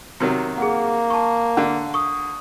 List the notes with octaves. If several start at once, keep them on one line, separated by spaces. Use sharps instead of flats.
C3 D#3 F#3
A#3 G#4 F#5
A5 C#6
D3
C#6 D#6